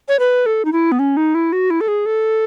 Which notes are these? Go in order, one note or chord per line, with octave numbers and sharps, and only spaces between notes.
C#5
B4
A4
D#4
E4
B3
C#4
D#4
E4
F#4
E4
A4
G#4
A4